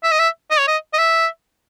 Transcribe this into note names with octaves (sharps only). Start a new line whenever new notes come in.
E5
D#5
E5
D#5
C#5
D#5
D#5
E5